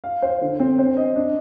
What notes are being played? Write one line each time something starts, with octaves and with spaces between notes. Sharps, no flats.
F5
C5
D3
C4
C5
D#5
D4